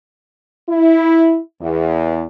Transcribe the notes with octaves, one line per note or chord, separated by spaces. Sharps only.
E4
E2